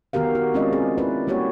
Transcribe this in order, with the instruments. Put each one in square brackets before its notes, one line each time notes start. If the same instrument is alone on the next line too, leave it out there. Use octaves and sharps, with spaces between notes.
[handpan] D#3 B3 F#4 G4 A#4 F5
F#4
G#3 C4 C#4 F4 D5 D#5
G#4
E4 B4 D5
G3 A#3 F#4 G4 C#5